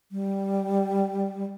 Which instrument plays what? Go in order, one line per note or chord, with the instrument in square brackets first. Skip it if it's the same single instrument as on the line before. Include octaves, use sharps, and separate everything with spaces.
[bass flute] G3